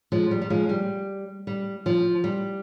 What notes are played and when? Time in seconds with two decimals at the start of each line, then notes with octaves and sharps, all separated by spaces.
0.12 F3 G#3
0.31 G3
0.42 G3
0.50 F3 G#3
0.69 G3
1.47 G3
1.86 F3
2.24 G3